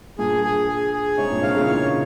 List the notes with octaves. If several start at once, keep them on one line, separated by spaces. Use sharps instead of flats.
G2 A#2 G#4
G#4
G#4
G#4
G#2 C3 C#5
G2 A#2
G#2 C3 F5
A#2 C#3
C3 E3 C#5